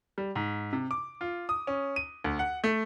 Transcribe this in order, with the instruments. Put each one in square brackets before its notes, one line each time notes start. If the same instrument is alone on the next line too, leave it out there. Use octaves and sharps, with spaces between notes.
[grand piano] G3
G#2
C3
D6
F4
D#6
C#4
D#7
D2
F#5
A3